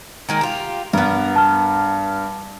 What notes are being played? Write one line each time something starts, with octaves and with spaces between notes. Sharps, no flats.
D#3 G#3 A#3
F4 G4
G2 B3 A#4
A5 F6